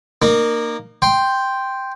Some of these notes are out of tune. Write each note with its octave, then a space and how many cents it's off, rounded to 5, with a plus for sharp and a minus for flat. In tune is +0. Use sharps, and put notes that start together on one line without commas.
A#3 +0 D#4 -40
G5 +0 C6 +0